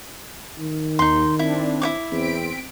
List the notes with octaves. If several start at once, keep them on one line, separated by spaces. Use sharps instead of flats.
D#3
D#2 D#4 C6
C4 D4 E4
E4 C#5 D6
E2 C4 B6 D7